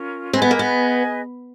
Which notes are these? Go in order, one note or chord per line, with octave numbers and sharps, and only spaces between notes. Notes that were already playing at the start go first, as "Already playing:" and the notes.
Already playing: C#4 F4 A#4
C4 G#4 B4 D#5 G#5
B3
A#3
B3